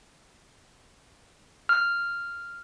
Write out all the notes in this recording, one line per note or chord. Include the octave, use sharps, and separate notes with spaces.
F6